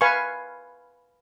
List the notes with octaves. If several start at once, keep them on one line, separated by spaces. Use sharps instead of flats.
B4 F5 G#5 C#6